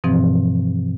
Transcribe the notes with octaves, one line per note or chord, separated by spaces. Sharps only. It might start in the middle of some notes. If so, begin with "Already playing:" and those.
G2 B2 E3 F3 C4